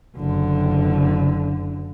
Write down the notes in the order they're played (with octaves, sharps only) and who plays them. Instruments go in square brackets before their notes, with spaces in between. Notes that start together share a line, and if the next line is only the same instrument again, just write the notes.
[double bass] F#1 D3